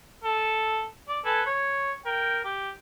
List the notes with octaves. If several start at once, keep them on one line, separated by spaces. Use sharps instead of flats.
A4
D5
A4 B4 G#5
C#5
A#4 G5
G4